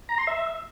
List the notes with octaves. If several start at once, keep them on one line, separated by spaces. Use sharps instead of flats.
A#5
C6
E5